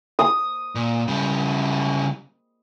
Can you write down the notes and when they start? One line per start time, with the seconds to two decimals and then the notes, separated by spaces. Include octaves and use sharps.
0.19 D#6
0.75 A#2
1.08 C#3 G3